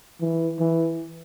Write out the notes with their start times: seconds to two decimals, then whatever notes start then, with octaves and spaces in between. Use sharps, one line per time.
0.21 E3
0.60 E3